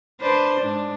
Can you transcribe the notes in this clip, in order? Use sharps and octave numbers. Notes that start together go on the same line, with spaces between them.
D4 B4 C5
G#2 D4